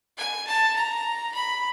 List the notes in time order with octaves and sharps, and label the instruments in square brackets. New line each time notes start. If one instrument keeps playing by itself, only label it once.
[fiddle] G#5
A5
A#5
B5